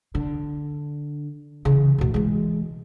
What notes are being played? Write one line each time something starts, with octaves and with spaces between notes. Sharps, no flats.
D3
C#3 E3
D2 B2
E3 G#3